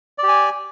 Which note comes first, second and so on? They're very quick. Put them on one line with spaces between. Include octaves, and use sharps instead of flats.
D5 G4 G#5